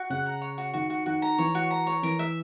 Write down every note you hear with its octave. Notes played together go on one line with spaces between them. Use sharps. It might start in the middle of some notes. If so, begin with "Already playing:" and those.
Already playing: F#4
C#3 F#5
A#5
C#5
F#4
D#3 F#4
F#4
D#3 F#4
A#5
E3 C#5
F#4
A#5
C#5
E3 A#4
E5